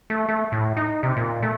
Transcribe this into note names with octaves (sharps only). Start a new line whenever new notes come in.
A3
A3
A2
D#4
C3
A#2
A3